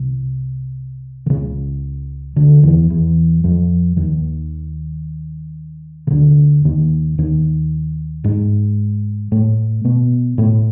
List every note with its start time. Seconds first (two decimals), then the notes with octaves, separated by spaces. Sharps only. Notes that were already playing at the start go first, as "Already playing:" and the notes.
Already playing: C2 C3
1.26 D3
1.29 C#2 C#3
2.36 D2 D3
2.63 E2 E3
2.90 E2 E3
3.44 F2 F3
3.97 D#2 D#3
6.07 C#3
6.10 D2 D3
6.65 D#2 D#3
7.18 D#2 D#3
8.24 G#2 G#3
9.32 A2 A3
9.84 B2 B3
10.38 A2 A3